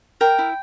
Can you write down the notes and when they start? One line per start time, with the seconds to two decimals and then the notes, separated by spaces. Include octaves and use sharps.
0.21 A#4 G5
0.38 E4